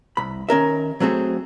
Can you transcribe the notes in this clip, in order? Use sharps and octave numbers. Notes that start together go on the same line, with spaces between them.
C2 B5
D#3 C#4 A#4 E5
F#3 A3 C4 F#4 G#4